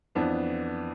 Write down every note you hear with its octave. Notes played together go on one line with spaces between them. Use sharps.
F2 E3 B3 D4